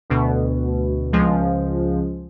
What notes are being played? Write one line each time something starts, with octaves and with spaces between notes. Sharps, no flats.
D2 B2
C#2 F3 G#3